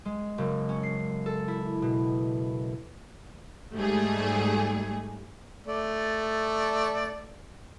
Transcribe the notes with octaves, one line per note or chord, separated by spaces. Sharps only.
G#3
F#1
C#4
C7
A4
E4
B2
G#2 G3 A3 G#4
A3 D5